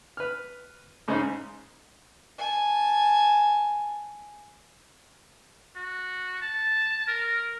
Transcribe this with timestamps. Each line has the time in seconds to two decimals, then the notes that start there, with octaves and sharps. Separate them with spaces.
0.17 B4 F6
1.08 G#2 C#3 G#3 C#4 D#4 C5
2.38 G#5 A5
5.76 F#4
6.42 A5
7.07 A#4